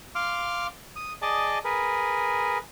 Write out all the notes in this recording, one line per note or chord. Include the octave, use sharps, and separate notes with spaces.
F5 C6 D6 F6
D#6
G#4 D5 D#5 A5
G#4 A#4 B4